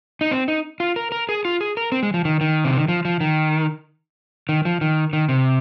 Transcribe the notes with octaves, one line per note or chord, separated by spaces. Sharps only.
D#4
C4
D#4
F4
A#4
A#4
G#4
F4
G#4
A#4
C4
G#3
F3
D#3
D#3
C3
D#3
F3
F3
D#3
D#3
F3
D#3
D#3
C3